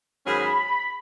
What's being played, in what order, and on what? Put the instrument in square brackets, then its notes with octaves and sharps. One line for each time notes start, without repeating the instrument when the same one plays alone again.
[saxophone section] G#2 D#3 F#3 C#4 G#4 [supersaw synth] B5